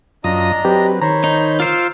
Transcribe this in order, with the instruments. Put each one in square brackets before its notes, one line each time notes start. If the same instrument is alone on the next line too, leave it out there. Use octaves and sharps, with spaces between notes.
[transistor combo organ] F#2 F4 D#6 [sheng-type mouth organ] D4 D#5 A#5
[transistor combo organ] F#3 C4 B4 [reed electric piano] G4
[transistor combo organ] D#3 [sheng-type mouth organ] C5 C#5 B5 [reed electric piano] A#5
[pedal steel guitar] D#4
[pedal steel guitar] F4 C5 [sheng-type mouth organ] D6 E6 F6